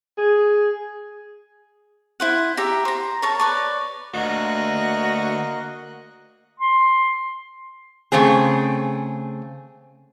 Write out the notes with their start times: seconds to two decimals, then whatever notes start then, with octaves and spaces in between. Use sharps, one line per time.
0.18 G#4
2.20 E4 C5 F#5
2.57 G4 E5 A#5
2.85 C5 A#5
3.22 A#4 C#5 A5
3.39 B4 C#5 D5
4.14 D2 A#3 F#4 D#5 F#6
6.60 C6
8.12 C#3 A3 C4 G#4